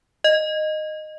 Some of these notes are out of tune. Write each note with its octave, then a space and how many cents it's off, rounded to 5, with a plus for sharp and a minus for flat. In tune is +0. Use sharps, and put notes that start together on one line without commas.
D#5 -10